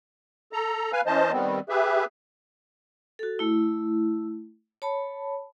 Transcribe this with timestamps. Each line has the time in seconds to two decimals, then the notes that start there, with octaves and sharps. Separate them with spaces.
0.52 A4 A#5
0.92 B4 F5 G#5
1.06 E3 C#4 C5 D#5 A5
1.32 D#3 G3 B3 C4
1.69 G4 G#4 B4 E5
3.19 F#4 A4
3.39 A3 E4
4.82 C#5 A5 B5